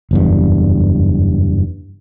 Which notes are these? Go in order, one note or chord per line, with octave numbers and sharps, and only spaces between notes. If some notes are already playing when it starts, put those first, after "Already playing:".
F#1 E2 G2